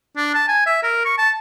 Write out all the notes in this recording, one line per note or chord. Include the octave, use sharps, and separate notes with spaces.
D4
A5
G#5
E5
A#4
C#6
A5